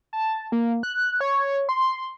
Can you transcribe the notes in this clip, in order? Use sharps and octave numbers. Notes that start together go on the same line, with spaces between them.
A5
A#3
F#6
C#5
C6